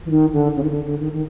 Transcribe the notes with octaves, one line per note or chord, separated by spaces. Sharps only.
E3
D#3
D3
C#3
D#3
D3
D3
D#3
D#3